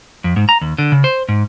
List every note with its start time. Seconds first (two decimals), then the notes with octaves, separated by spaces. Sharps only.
0.24 F2
0.36 G#2
0.49 A#5
0.61 D#2
0.78 D3
0.92 C#3
1.04 C5
1.29 G#2